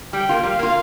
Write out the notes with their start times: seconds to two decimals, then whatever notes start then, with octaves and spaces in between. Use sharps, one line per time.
0.13 G3 G5
0.29 A#3 F4
0.43 G3 F5
0.59 A#3 F4